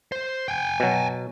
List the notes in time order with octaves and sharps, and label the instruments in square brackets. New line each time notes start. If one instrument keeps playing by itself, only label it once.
[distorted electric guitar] C5
G5 G#5
[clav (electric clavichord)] B2 F#3